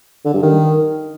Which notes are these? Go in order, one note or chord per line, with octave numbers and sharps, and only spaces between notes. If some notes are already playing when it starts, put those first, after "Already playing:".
D3
G2
D#3